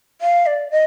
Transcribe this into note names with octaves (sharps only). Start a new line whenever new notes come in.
F5
D5
D#5